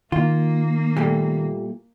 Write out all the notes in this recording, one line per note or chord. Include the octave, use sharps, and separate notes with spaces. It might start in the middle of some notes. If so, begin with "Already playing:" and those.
D#3 A#3 F4
A#2 G3 A3